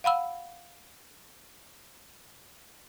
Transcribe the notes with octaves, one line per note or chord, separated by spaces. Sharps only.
F5 F#5 B5 E6